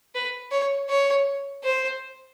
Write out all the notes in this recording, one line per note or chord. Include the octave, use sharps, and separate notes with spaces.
B4
C#5
C#5
C5